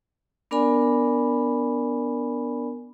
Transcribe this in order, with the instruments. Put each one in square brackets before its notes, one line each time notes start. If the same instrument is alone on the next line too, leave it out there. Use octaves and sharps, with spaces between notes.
[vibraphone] B3 D4 A#4 D5 G#5 B5